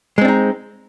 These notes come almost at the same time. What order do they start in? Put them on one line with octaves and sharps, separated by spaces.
G#3 C4 D4 D#4